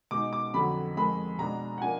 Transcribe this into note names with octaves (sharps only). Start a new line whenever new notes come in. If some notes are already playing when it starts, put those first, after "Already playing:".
B2 G#3 D#4 D6
D6
F2 D3 F#3 B5
F2 D#3 G#3 B5
B2 G#3 D4 A#5
F#5
F3 A#3 D4 F4 G#5